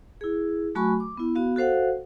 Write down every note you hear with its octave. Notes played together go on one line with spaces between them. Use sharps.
E4 G#4
F#3 A3 F#4 G#5 B5 C#6
D6
B3 E4
B3 F#4 F5
F#4 A4 C5 F5 F#5